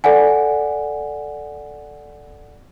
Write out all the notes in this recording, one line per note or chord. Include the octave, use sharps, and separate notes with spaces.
A4 D5 F#5 G#5